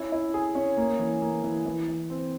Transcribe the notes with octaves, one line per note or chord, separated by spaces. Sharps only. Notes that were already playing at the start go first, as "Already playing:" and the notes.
Already playing: C#4 E4
E4
G#4
C#4
A#3
E3
A#3
E3
E3
E3
C4